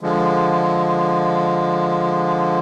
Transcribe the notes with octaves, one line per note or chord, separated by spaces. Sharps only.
D3 F3 G#3